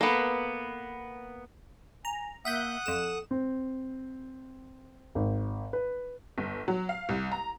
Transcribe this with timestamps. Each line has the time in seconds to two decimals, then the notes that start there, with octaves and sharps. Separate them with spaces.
0.01 A#3 B3 A4 B4
2.05 G#5 A#5
2.45 A#3 E5 F#5 D#6 F#6 G6
2.86 F2 A4 E7
3.31 C4
5.15 G#1
5.73 B4
6.38 G1
6.68 F#3
6.89 F5
7.09 C2
7.32 A#5